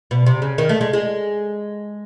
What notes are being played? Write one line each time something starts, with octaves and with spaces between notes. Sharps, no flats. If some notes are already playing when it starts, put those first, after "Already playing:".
B2
C3
C#3
D#3
A3
G#3
G#3